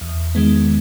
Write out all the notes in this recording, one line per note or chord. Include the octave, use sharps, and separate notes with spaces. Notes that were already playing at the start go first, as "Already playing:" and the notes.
E2
D#3 G#3 B3